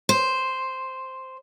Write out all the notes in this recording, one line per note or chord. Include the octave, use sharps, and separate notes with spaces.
C5